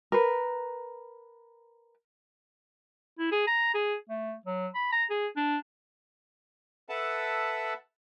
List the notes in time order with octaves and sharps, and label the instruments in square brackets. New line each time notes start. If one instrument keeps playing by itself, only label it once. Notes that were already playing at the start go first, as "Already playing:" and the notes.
[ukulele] A#4 B4
[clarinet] E4
G#4
A#5
G#4
A3
F#3
B5
A#5
G#4
D4
[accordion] A4 B4 E5 F#5 A5